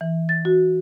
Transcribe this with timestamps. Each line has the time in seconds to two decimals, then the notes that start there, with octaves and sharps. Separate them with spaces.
0.01 E3
0.29 A6
0.45 F#4